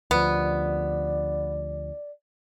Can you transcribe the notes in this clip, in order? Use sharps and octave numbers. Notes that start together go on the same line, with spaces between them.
D2 F3 B3 D5